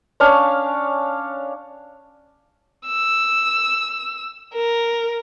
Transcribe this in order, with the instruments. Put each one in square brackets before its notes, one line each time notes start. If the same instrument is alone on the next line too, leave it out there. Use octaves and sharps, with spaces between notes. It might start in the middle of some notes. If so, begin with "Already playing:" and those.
[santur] C#4 D4 C#5 F5
[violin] E6
A#4